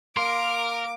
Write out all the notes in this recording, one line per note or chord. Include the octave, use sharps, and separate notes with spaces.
A#3 A#4 C6 D6